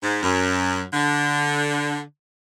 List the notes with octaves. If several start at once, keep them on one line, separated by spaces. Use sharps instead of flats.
G#2
F#2
D3